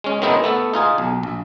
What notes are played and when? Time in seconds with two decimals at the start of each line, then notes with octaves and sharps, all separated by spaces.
0.04 G#3 C#4
0.22 D#3 G#3 B3 C4 D#4 E4
0.44 A3 B3 A4
0.73 D#4 F4 G#4
0.98 B1
1.23 A#1